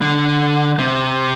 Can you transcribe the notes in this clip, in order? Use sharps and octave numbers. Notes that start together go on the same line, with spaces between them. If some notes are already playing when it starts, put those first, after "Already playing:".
D3
C3